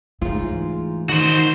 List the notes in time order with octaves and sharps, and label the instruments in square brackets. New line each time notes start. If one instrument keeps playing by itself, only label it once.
[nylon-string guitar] G#2 F4 [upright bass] E3 A3
[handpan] D#3 [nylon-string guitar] D#4 [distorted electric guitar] F#4 C5